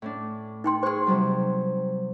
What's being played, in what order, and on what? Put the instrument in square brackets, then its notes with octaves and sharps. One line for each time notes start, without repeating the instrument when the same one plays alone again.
[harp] A2 C#4 D4
[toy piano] D#4 G5 C6
[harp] G#4 C#6 [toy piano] C5 C6
[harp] C3 F#3 G3